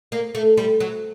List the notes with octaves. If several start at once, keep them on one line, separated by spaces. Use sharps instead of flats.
A#3
A3
G3
F#3